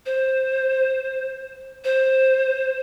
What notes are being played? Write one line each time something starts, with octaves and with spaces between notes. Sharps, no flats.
C5
C5